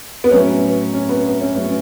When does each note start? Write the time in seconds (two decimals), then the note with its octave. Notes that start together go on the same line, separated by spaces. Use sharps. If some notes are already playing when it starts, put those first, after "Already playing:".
0.24 B3
0.31 A2 F#3 C#4
0.94 C#4
1.09 B3
1.26 B3
1.41 C#4
1.56 A2 F#3 C#4